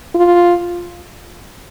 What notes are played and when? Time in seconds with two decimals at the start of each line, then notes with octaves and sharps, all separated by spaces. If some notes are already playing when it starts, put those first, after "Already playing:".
0.15 F4